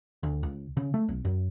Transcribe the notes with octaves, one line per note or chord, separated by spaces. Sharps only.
D2
C#2
C#3
A3
B1
F#2